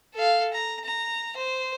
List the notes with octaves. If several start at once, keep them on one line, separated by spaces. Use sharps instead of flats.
A4 F5
A#5
A#5
C5